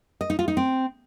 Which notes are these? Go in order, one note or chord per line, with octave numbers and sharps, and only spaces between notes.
D#5
D#4
F4
D#4
C4